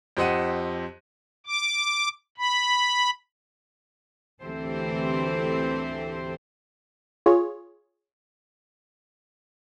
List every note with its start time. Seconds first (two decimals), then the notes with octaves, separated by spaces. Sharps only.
0.17 F2 G4 C5 D#5 F#5 D#7
1.47 D6
2.38 B5
4.42 D2 E3 C4 G4 A4 C5
7.26 F4 G#4 C#5